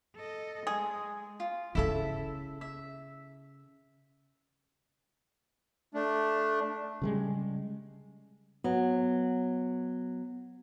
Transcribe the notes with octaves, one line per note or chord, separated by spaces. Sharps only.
A4 D#5
G#3 G#4
F4
C#3 C#4 E4 A4 E5
E5
A3 D4
C#3 G3 G#3
F#3 B3